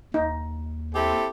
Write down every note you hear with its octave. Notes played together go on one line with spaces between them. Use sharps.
D#2 D#4
C4 E4 G4 A4